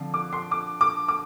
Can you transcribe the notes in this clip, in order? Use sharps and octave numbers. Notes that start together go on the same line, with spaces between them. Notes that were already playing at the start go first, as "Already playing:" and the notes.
Already playing: D3 F3 C4
D6
C6
D6
D6
D6